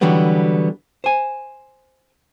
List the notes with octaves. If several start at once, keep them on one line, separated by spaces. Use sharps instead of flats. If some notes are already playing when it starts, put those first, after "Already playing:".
D3 E3 F#3 G3 B3
C5 G#5